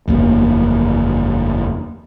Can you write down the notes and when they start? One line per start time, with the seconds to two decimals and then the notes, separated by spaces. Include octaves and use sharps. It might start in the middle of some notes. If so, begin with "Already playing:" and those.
0.08 F#1 E2 A#3